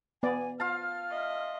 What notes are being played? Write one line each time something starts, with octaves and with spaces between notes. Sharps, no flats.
B3 D5 G#5
F4 F5 A5 F6
D#5 E5